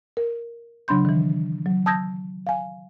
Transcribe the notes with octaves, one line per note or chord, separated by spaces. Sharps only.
A#4
C#3 F#3 D4 B5 C6 G6
D#3 E3
F#3
A5 D#6 E6 G6 G#6 A#6
F5 G#5